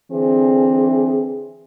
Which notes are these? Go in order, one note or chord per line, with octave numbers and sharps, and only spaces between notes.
D3 E3 C4 G#4